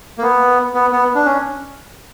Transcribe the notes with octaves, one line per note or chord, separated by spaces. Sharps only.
A#3
B3
B3
B3
D4
C#4